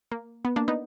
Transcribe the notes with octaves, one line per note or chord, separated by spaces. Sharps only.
A#3
B3
A#3 D4
B3 D#4